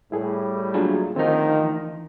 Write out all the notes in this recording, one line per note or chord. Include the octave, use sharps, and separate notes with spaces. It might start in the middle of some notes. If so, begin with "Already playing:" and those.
A2 G3 E4 G#4 A4
A#2 D3 F#3 D4 F4 G#4
D2 D#3 F3 C4 D#4
E3